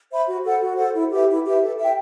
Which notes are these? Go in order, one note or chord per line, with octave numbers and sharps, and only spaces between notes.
C5 E5 B5
F#4
A4 C5 F#5
F#4
A4 C5 F#5
E4
G4 B4 E5
E4
G4 B4 E5
A4
E5 G5